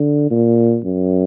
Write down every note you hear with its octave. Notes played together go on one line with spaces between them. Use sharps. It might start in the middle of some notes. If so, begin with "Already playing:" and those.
Already playing: D3
A#2
F#2